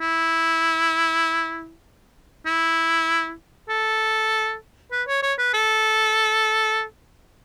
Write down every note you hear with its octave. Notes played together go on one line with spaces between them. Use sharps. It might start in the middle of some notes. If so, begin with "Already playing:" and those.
E4
E4
A4
B4
C#5
C#5
B4
A4